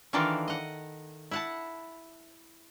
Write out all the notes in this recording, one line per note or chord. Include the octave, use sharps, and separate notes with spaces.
D#3 E3 D4 F4 A4 A#4
D#5 F#5
E4 F#5 A5